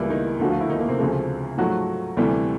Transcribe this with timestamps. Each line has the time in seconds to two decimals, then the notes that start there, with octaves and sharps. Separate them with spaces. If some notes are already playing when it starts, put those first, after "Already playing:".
Already playing: C#2 C#3 E3 G3 A#3 E4
0.10 D#3 D#4
0.40 D2 D3 F3 A3 F#4
0.50 F4
0.60 E4
0.70 D#3 D#4
0.79 A#3
0.89 C3 C4
0.99 D2 C#3 F3 G#3
1.57 G#2 F3 F#3 A3 F#4
2.17 D2 C3 E3 G3 A3 G4